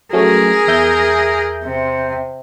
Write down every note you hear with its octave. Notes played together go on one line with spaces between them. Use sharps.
F#3 A3 C#4 G#4 A#4
E2 E5 G6
C3